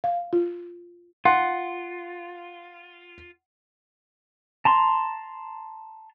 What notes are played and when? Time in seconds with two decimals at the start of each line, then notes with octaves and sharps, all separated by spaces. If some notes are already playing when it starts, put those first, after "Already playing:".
0.04 F5
0.33 F4
1.25 F4 F#5 C6
4.65 A5 A#5 C6